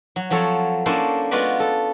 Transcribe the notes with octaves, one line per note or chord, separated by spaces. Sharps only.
F#3
F3 F#3 C4 A4 C#5
A#3 C#4 D4 E4 A4 C5
G#3 B3 F4 F#4 B4 D5
A4